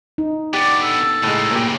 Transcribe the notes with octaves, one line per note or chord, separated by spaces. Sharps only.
D#4
B3 D4 G4 D5
A4
A2 C#3 G#3 A#3
A#2 G4